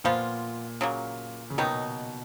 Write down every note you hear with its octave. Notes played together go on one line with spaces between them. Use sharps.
A#2 F3 B3 F4
C#3 F#3 A#3
C#3
B2 D#3 F#3 B3 D#4